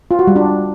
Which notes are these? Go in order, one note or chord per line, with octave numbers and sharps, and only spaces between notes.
F4
F#4
G3
D4